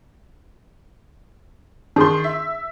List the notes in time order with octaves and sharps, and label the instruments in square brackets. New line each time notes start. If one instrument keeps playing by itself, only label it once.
[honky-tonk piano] D#3 C6 [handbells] D4 G#4
[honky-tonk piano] E5